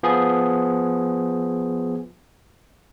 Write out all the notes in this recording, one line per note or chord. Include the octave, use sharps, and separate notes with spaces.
F3 B3 G#4